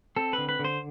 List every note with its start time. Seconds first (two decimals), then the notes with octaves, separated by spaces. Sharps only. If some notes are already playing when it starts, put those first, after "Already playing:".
0.16 C4 A4
0.33 B4
0.38 D3
0.49 B4
0.59 D3
0.64 C5